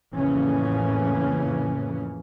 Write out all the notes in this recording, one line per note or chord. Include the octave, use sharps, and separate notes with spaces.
F2 A2 C#3 E3 A#3 C#4